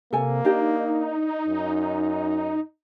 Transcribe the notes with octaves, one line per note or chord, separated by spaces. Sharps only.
C3 A#3 A4 G#5
D4 D#4 G4 D#5
F#2